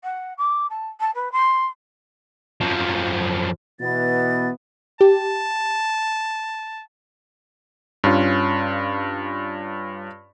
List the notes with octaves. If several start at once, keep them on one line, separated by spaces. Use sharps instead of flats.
F#5
D6
A5
A5
B4
C6
F#2 F3
B2 E3 B3 A6
G4 A5
G2 C#4 F4